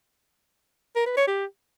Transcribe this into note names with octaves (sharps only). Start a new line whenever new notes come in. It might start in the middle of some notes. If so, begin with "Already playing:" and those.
A#4
B4
C#5
G4